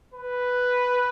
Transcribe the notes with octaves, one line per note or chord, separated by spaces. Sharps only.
B4